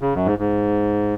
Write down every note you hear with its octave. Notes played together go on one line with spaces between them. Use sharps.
C#3
F#2
G#2
G#2